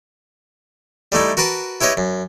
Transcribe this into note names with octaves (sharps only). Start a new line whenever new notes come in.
G3 A3 D#4 E4
F#4 A#4 B4 A5 D6
E4 G4 B4 C#5 D#5
F#2